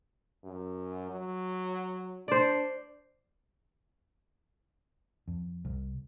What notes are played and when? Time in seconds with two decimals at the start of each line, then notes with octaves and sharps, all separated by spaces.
0.44 F#2
1.10 F#3
2.28 D4 C5 D5
5.28 F2
5.65 C2